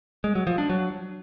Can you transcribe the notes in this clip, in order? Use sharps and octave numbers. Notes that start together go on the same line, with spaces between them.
G#3
F#3
F3
D4
F#3